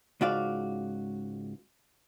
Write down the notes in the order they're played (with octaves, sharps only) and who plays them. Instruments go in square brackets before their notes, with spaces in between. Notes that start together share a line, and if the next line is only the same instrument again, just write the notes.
[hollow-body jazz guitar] C#2 G#2 F#4 D5 F5